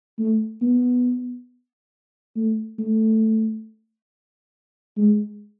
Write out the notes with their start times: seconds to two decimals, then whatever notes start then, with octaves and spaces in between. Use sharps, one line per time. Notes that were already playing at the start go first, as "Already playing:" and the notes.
0.19 A3
0.62 B3
2.36 A3
2.79 A3
4.97 G#3